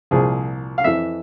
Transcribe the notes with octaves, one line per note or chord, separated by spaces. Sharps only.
C2 A#2 F3 G#4
F5
F2 E3 E5